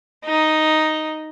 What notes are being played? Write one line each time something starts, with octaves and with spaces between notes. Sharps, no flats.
D#4